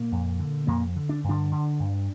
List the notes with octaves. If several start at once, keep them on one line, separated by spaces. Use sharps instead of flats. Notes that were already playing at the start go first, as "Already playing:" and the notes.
Already playing: A#2 A#3
F2
D3
F2 A#2 A#3
D3
D4
G2
D3 D4
D3
G2